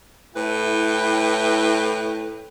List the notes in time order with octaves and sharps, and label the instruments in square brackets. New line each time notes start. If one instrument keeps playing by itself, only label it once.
[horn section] A2 E4 B4 G5